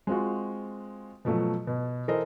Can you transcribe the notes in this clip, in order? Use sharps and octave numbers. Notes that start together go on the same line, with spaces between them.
G#3 C4 F4 F#4
B2 F3 F#3 A3
B2
E3 A4 A#4 C5 D#5